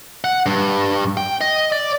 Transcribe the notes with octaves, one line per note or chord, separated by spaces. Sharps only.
F#5
G2
G5
D#5
D5